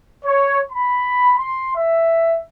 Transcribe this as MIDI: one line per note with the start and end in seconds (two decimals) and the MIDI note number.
0.25 0.59 73
0.71 1.37 83
1.37 1.74 84
1.75 2.38 76